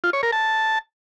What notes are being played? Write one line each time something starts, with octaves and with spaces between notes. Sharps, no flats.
F4
C#5
A#4
A5